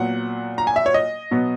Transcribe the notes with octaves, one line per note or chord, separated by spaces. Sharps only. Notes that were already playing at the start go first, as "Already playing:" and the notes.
Already playing: A#2 F#3 B3 F#5
A#5
G#5
E5
C#5
D#5
B2 F#3 B3